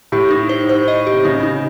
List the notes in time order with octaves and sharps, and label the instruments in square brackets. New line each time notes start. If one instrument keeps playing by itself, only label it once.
[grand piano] A2 [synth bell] G4
[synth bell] D#4
C5
C5
D#5
G4
[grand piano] C3
[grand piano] C#3 [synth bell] D#4
[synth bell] D#4